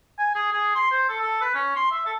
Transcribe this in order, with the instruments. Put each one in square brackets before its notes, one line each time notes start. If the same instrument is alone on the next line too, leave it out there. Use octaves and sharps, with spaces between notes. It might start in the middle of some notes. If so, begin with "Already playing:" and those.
[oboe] G#5
G#4
G#4
C6
C5
A4
A4
B4
C#4
C6
E5
A4